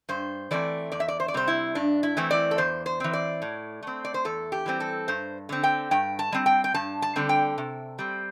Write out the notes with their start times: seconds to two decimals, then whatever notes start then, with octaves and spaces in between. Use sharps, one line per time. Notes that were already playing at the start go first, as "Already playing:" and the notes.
0.09 G2 C5
0.51 E3 A3 C4 D5
0.92 E2 D5
1.00 E5
1.08 D5
1.20 C5
1.28 D5
1.34 C3 G3 C4 C5
1.48 E4
1.75 G2 D4
2.03 E4
2.17 E3 A3 C4
2.31 D5
2.51 A4
2.58 E2 C5
2.86 C5
3.00 E3 C4
3.13 D5
3.42 A2
3.83 A3 C4
4.05 D5
4.14 C5
4.25 E2 A4
4.52 G4
4.66 E3 G3 C4
4.80 A4
5.08 G2 C5
5.49 D3 C4
5.64 G5
5.91 G2 G5
6.19 A5
6.32 G3 C4
6.46 G5
6.64 G5
6.74 G2 A5
7.02 A5
7.16 D3 G3 C4
7.29 G5
7.58 C3
7.99 G3 C4